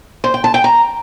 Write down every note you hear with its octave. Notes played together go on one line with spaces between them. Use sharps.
C5
G5
A5
G5
A#5